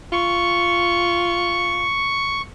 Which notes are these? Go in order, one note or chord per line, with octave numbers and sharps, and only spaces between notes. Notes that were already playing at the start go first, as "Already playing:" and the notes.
F4 C#6